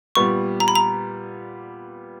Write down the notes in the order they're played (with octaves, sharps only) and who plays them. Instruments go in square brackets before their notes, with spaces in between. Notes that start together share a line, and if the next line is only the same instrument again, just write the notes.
[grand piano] A#2 G3 B3 [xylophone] C#6
[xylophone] A#5
B5
A#5